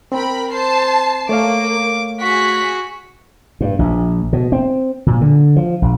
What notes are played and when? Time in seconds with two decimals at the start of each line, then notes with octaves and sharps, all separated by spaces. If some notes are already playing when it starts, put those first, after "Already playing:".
0.12 C4 A#4 G5 B5
0.51 C5 A5 C7
1.29 A3 A#3 C#5 F5 D6
2.20 F#4 G#4 B6
3.61 G2
3.79 A#1
4.33 B2
4.52 C4
5.06 A#2
5.21 D3
5.56 F3
5.82 A#1